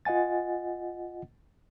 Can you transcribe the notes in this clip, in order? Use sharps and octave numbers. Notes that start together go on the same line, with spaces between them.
F4 D#5 F#5 G#5 A6